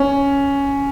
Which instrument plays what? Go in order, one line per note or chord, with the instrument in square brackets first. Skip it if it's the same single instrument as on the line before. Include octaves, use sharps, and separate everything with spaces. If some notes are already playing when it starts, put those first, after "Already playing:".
Already playing: [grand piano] C#4